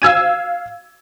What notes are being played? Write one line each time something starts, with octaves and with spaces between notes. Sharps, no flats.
F5 E6 G#6 D#7